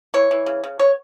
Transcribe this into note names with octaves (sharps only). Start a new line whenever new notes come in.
E3 C#5
E3
C#3
C#3
B3 C#5